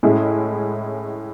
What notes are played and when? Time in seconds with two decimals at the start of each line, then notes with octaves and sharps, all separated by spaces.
0.03 A2 G#3 C#4 E4 G#4